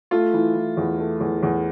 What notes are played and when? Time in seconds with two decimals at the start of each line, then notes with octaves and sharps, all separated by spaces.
0.11 A3 F4
0.34 E3
0.55 E3
0.77 E2
0.99 A3
1.20 E2
1.43 E2